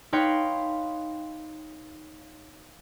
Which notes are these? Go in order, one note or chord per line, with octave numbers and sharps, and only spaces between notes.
D#4 B4 C#5 F5 G5 C6